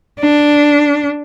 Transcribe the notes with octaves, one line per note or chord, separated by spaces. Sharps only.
D4